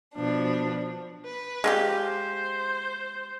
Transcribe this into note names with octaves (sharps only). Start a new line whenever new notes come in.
B2 F3 D4
B4
G#3 F4 G4
C5